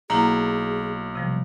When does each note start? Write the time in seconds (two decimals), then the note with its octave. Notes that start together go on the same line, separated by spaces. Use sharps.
0.10 B1 A#3 E4 G#4 F#5 A#5
1.15 C3 F3 G3